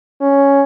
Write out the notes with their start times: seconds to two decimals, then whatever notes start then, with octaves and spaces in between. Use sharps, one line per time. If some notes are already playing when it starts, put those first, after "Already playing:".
0.21 C#4